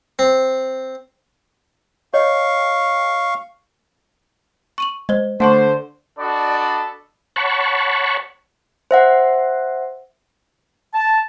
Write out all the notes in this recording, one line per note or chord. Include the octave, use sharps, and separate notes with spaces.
C4
C#5 D#5 F5 C#6
C#6 D#7 F#7
G#3 C5 D#5
D3 A3 C5 F#5 A5 C#6
D4 F#4 A4 D5 D#5 B5
C#5 F#5 A5 B5 C#6
C5 E5 F#5
A5